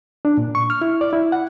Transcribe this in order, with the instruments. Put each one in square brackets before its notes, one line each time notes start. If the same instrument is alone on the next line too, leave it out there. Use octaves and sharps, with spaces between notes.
[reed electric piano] D4
A#2
C#6
F6
E4
D5
E4
F#5